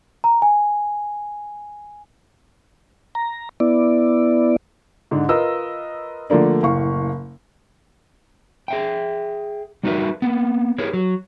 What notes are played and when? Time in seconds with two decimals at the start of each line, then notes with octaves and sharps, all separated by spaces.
0.24 A#5
0.42 G#5
3.15 A#5
3.60 B3 E4 D5
5.11 G#2 D3
5.29 F4 A#4 B4 D#5 E6
6.30 D3 F3 A3 A#3 D4
6.63 F#1 A2 F5 C#6
8.68 G#4 E5 G5
9.83 G3 D#4 F#4 A#4 B4 E5
10.22 A#3 B3
10.78 E4 G4 G#4 A#4 B4 C#5
10.93 F#3